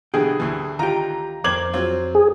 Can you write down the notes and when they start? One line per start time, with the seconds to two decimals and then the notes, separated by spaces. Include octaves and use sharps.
0.14 B2 D3 E3 G4 G#4
0.40 D2 E3
0.79 D#3 F4 G4 A#5
1.44 F2 C4 A#4 C5 D6 G#6 F#7
1.73 F#3 C4 F4
2.15 G#4